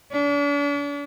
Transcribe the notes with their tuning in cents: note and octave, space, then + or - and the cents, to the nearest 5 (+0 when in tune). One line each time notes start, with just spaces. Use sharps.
D4 -40